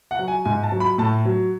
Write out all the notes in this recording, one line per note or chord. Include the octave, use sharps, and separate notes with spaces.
F#5
F#3
G#5
G#2 G#5
A5
F#3
B5
A2 A5
F#3